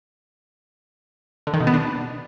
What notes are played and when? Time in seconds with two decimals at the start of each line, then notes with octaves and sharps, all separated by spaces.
1.47 D3
1.54 D#3
1.60 B2
1.67 B3
1.74 D4